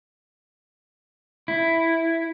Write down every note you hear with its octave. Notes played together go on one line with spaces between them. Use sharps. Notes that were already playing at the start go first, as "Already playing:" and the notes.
E4